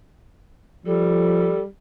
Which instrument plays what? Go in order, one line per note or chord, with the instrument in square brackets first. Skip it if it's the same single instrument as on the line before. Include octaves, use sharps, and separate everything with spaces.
[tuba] F3 [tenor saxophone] G3 [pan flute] A4